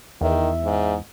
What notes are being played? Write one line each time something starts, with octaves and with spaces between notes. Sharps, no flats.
E2 D#3 E5
G#2